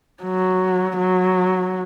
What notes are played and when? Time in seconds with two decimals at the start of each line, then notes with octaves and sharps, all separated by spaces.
0.23 F#3
0.98 F#3